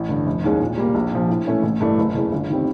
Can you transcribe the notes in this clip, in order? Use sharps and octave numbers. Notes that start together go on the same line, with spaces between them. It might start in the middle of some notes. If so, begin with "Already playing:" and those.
Already playing: A1
G2 D3
F1
D#2 D#3 G#3 C#4
A#2
G3 A#3
A#1
A#2 F3
A2
E3 A3 C#4 E4
A1
G2 E3 A3 D4
F#1
E2 C#3 E3
G1
D#3 G3 C4